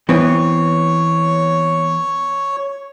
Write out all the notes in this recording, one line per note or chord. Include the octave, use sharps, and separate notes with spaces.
E3 B3 C4 C#5